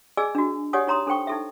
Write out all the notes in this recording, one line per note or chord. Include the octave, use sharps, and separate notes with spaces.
G#4 D5 D#5 G#5 E6
D4 F#4
G4 C#5 D5 F#5 G#5 D#6
D#4 C#5 A#5 C6 D#6
D4 A4 C5 G5 C#6
D#4 A4 E5